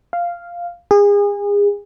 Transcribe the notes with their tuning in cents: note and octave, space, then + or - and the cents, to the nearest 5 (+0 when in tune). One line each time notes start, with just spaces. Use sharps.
F5 -5
G#4 -35